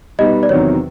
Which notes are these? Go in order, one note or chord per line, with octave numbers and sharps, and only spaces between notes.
B2 G3 B3 D#4 D#5
D5
E2 C3 D#3 F#3 C#5